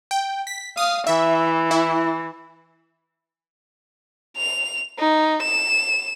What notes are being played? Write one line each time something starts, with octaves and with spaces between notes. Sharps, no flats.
G5
B6
F5 D#6
E3 E5
E4
F7
D#4
E7